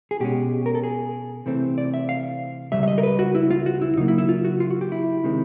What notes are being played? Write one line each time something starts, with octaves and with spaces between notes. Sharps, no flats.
G#4
B2 G#3 C#4 G4
A#4
A4
G#4
C3 E3 A3 C4
D5
E5
F5
C#2 B2 G3 E5
E5
D#5
A#4
B4
F#4
E4
F4
F#4
E4
C#3 F#3 A#3 D#4
E4
E4
F4
F#4
F4
F#4
G4
E4
C3 D#3 G#3 C4